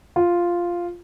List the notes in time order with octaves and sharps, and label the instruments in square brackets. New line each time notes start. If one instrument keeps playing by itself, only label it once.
[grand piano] F4